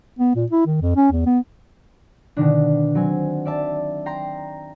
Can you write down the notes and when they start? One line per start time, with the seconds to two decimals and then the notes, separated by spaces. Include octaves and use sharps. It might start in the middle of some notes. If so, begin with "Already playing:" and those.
0.19 B3
0.35 A#2
0.52 E4
0.67 D#3
0.82 F2
0.96 C#4
1.11 E2
1.26 B3
2.37 B2 D3 D#3 D4
2.95 F#3 C4 G#5
3.45 D5 E5 A5
4.06 G5 A#5 C6